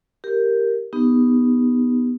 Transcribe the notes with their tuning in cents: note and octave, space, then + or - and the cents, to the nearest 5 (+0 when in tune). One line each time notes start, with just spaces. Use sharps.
G4 +0 A#4 -5
B3 +0 D#4 +0 G4 +15